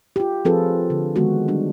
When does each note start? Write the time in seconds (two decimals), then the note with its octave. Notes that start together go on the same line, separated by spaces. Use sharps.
0.16 F4 G4
0.45 F3 C4 F4 G#4 A4 B4
0.90 D3
1.16 D3 D#3 G#3 B3 F#4
1.48 G3 D4